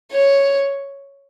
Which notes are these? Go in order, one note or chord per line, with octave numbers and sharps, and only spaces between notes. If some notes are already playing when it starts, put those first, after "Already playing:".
C#5